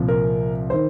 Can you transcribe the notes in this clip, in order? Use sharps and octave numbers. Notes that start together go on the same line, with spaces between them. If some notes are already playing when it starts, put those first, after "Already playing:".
Already playing: C2 A#2 F3
A#4
D#3 C5